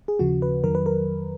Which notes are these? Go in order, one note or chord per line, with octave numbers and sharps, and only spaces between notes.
G#4
D#2 C#3 F3 F#4
B4
F2 D#3 F#3 A#4
B4
A#4